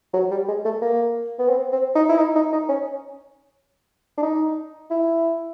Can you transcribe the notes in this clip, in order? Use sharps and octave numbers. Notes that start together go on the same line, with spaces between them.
F#3
G3
G#3
A3
A#3
B3
C4
C4
D#4
E4
D#4
D#4
D#4
C#4
D4
D#4
E4